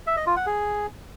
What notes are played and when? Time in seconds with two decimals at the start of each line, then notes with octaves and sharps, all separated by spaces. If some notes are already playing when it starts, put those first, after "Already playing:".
0.07 E5
0.17 D#5
0.27 F4
0.36 F#5
0.46 G#4